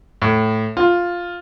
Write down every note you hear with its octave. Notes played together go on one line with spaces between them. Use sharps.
A2
F4